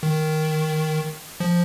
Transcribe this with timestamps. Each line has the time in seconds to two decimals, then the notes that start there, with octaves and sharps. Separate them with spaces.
0.03 D#3
1.40 F3